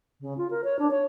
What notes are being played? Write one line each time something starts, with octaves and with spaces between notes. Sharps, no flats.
C#3
F4
A#4
C#5
D4
C#5